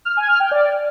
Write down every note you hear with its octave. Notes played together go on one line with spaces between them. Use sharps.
F6
G#5
F6
G5
D5